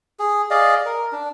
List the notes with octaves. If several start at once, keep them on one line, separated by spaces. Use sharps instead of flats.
G#4
G#4 D5 D#5 F5
A#4
D4